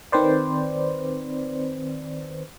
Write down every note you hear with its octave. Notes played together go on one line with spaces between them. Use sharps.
D#3 C4 B4 C5 D5